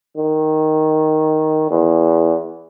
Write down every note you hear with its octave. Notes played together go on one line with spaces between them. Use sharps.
D#3
E2